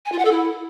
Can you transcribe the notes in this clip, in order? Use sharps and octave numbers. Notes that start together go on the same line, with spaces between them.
G#5
F4
F#5
A4
E4